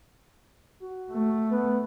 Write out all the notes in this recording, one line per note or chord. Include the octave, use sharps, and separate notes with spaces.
F#4
A3
B3